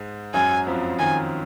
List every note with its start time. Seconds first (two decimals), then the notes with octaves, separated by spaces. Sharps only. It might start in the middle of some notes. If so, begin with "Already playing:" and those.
Already playing: G#2 G#3
0.34 F#2 F#3 G#5
0.67 F2 F3
0.99 D#3 G#5